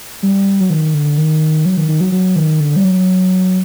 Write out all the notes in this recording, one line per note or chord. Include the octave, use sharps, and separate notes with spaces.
G3
F#3
D#3
D3
D#3
F#3
D#3
D#3
F#3
F#3
D#3
D3
G3
F#3